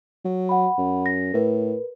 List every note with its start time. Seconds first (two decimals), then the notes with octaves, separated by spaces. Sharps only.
0.25 F#3
0.49 F#5 B5
0.78 F#2
1.06 A#6
1.34 A2 A#4 B4